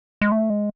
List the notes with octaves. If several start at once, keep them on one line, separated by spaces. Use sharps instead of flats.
G#3
A3
G#3